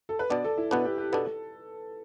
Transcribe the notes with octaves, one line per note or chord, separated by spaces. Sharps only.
A4
B4
B2 B3 D4 D5
A4
E4
B2 B3 D4 B4
G4
G4
B2 B3 D4 A4